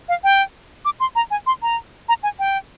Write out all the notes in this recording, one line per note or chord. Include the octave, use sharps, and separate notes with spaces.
F5
G5
D6
C6
A#5
G#5
C6
A#5
A#5
G#5
G5